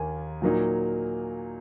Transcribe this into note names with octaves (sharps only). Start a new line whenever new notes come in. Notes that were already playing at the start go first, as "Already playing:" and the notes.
Already playing: D#2 D#3 A#3 G#5
A#2 F#3 A#3 D#4